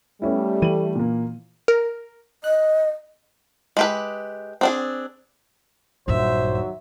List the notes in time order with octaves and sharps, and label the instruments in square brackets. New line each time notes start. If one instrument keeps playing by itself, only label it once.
[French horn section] G3 A3 [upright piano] B3 C#4 E4
[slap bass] E3 [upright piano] D#7 F#7
[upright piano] A#2 A#3
[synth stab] A#4
[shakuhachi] D#5 [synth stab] F#6
[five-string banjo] G#3 G4 B4
C4 D4 G#4
[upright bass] A#1 G2 [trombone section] D#3 F#3 [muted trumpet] C5 [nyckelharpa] E5